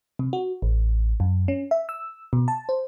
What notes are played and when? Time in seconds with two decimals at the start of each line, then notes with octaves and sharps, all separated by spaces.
0.19 C3
0.33 F#4
0.62 A1
1.20 F#2
1.48 C#4
1.71 E5
1.89 E6
2.33 B2
2.48 A5
2.69 C5